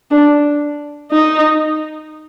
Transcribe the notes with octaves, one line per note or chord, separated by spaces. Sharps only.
D4
D#4